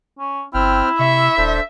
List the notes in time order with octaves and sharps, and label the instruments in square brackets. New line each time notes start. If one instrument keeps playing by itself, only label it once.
[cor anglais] C#4
[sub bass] G1 [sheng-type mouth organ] C4 G5 F6 [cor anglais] E4
[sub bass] C3 [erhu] E5 [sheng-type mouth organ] C#6
[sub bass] D#1 [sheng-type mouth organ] D4 A4 C5